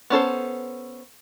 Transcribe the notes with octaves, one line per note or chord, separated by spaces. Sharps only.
B3 C#4 A4 C5